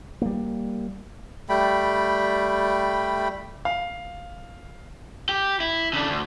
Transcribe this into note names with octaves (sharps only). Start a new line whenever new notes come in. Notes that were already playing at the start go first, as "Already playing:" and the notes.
G3 A#3
G3 A3 G5 B5
F5
G4
E4
C#3 D4
D2